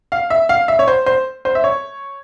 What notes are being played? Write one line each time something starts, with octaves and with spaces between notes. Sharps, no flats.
F5
E5
F5
E5
C#5
C5
C5
C5
E5
C#5